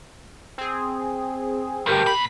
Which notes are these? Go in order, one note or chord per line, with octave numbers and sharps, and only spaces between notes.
C4 G#4
D2 G2 G4 A#4 G6
A#2 B5 B6